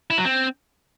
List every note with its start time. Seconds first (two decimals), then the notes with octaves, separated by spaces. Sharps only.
0.10 E4
0.18 F#3
0.25 C4